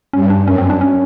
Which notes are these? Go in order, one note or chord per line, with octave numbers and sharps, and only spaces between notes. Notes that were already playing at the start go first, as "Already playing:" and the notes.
G2 C#4
D4
F#2 C#4
C4
C#4
D4
C#4